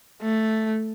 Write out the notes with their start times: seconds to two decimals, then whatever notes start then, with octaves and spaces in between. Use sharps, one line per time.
0.22 A3